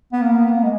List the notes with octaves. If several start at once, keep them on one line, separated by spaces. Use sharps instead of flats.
B3
A#3
B3
A#3
G#3